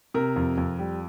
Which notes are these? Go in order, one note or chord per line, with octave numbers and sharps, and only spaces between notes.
C3 A#4
F2
F2
G3